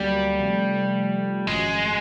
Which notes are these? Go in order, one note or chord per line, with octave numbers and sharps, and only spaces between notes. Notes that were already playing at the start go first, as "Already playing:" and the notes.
Already playing: D2 D3 F#3 G3 A#3
C3 F3 A3
G#1 F#2 C#3 F3 G#3